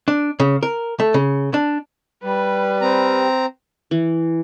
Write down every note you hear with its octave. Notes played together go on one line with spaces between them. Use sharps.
D4
C#3
A#4
A3
C#3
D4
G3 B4
C4 A#5
E3